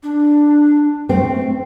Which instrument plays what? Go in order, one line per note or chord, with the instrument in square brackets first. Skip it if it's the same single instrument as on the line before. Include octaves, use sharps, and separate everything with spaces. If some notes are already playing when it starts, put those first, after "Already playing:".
[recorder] D4
[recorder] A3 [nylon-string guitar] C4